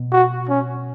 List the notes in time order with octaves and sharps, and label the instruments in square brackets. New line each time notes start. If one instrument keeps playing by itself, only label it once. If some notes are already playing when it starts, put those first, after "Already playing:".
Already playing: [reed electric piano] B2
[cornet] F#4
C#4